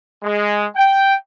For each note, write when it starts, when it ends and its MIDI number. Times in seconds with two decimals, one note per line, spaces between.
0.23 0.66 56
0.76 1.14 79